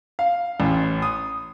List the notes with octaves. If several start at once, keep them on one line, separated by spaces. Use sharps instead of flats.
F5
A1
D#6